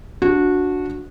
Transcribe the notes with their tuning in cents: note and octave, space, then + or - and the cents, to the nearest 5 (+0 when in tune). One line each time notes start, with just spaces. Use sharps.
D4 -10 F#4 -20